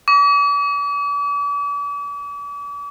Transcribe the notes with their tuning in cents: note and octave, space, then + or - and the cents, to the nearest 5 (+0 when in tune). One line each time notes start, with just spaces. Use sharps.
D6 -40